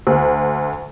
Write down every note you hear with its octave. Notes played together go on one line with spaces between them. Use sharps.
D2